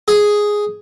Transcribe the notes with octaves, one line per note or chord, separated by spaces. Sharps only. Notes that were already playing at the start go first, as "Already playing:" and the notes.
G#4